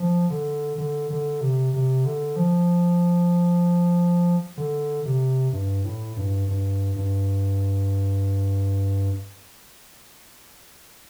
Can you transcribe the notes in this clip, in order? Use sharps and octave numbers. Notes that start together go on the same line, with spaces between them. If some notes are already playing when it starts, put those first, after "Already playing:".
Already playing: F3
D3
D3
D3
C3
C3
D3
F3
D3
C3
G2
A2
G2
G2
G2